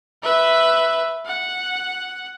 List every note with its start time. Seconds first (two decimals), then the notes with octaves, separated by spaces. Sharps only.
0.23 B4 E5
1.26 F#5